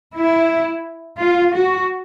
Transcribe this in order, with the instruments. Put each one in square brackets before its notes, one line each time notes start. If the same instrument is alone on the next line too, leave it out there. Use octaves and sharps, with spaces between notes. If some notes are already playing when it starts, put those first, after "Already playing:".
[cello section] E4
F4
F#4